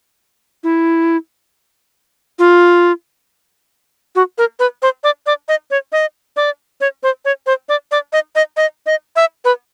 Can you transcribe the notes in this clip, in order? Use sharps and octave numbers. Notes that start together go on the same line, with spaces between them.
E4
F4
F#4
A#4
B4
C5
D5
D5
D#5
C#5
D#5
D5
C#5
C5
C#5
C5
D5
D5
D#5
D#5
D#5
D#5
E5
B4